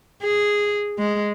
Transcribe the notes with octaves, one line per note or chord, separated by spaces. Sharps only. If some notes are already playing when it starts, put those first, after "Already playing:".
G#4
G#3